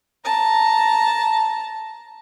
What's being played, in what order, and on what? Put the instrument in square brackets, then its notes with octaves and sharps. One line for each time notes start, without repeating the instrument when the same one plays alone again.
[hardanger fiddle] A5 A#5